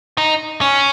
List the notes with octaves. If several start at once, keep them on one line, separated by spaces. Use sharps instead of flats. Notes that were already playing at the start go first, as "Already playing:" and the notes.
D#4
C#4